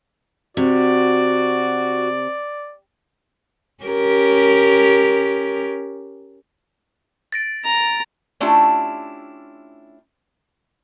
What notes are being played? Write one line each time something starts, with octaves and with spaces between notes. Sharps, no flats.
C3 F#4 D5
C#4 G4 A#4
A6 A#6 D7
A#5
A3 C#4 D4 E4 F4 G4